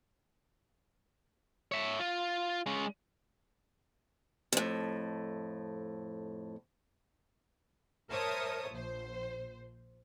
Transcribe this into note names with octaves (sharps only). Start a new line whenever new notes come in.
C#5 E5
F4
G#3 C#4
F2 A2
A#4 C5 C#5 E5 A5 D#6
A#1 C5